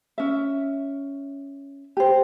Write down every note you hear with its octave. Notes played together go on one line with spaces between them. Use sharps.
C#4 E5
G4 C5